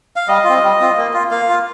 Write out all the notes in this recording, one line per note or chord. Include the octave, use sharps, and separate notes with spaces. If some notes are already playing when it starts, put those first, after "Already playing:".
F5
G3 D#5
C4 F4
G3
C4 F4
A#3
F4
A#3 F5
F4